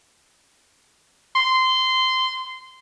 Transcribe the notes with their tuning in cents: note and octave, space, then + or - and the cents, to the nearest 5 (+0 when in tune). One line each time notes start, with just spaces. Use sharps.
C6 -15